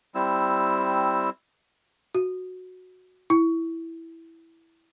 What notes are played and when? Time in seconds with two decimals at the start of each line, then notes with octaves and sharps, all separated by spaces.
0.15 G3 C4 E4 E6
2.15 F#4
3.30 E4